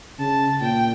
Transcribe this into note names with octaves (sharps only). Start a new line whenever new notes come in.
C#3 A5
A#2 G5